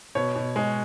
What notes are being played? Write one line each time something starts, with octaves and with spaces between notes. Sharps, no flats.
B2 C#5
B2
G#3